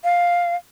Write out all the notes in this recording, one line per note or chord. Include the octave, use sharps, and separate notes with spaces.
F5